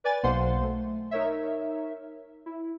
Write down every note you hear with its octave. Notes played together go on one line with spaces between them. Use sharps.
B4 D5 G#5 A6
B1 B2 A#3 C5 F#5 C6
A3
D#4 A#4 C#5 E5
E4